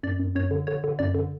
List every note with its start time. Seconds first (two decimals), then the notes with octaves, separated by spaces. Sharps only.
0.03 F#2 D5
0.19 F#2
0.35 F#2 C#5
0.51 D3
0.67 D3 C#5
0.84 D3
0.99 F#2 D5
1.15 D3